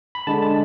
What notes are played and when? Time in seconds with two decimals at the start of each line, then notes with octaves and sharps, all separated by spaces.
0.15 B5
0.27 D3 G#3 D4 A5
0.42 A5